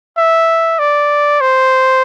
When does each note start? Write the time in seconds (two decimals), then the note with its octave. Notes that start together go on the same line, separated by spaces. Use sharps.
0.18 E5
0.79 D5
1.41 C5